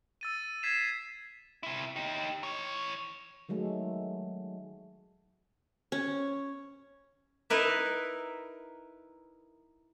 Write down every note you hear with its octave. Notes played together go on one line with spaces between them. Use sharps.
E6 A6 D#7
G#6 B6 C7 E7
C3 E4
D#4 G4
E3 C#5
D#3 F#3 G#3 A3
C#4
D#4 E4 A#4 B4 E5